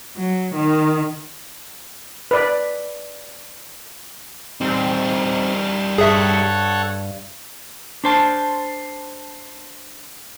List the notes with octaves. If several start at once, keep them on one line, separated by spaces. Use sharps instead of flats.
F#3
D#3
B4 D5
G3 C4 D#4
G2 G#4 A4 C#5 E5 F#5
D4 C5 A5